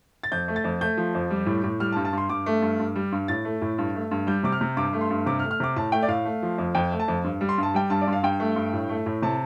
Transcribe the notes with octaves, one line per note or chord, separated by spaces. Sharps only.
A6
F2 G6
A3
A6
F2
A3 G6
F3
F2
G3
A2
A2
G3 F6
A5
G2
A5
G2 C6
G2 D6
A3
G2
G2
G3
G2
A2 A6
A3
A2
G2
A3
G2
G3 G6
C3 D6
F6
C3
G2 D6
A3
C6
G2
C3 D6
F6
A3
F6
C3 D6
A2 A5
A3 G5
D5
A2 F5
A3
F3
F2
F2 G5
A3
A5
F2
G2
G3
C6
G2 A5
G3 G5
G2 A5
D5
G2
F5
G2 G5
A3
G2
A2
A3
A2
C3 A5